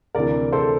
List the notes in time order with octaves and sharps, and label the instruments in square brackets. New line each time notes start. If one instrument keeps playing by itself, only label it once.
[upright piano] D2 C3 E3 A#4 D5
A4 C5